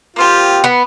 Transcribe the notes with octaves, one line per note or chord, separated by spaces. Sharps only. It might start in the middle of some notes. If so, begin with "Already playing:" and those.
A#3 C4 F4 G4
B3